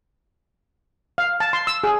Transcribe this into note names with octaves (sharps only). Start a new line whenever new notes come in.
F5
A5
C6
E6
G#4